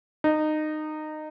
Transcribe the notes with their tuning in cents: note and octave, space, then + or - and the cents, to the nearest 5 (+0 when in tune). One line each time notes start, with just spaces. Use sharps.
D#4 -20